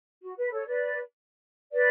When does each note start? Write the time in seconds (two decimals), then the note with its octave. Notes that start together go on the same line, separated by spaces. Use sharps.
0.21 F#4
0.37 B4
0.52 A4 C#5
0.66 B4 D5
1.72 B4 D5